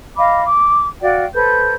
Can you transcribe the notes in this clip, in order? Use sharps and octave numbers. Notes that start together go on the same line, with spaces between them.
D#5 F5 B5 D6
D6
F#4 D5 F5 G5
A4 B4 C5 G6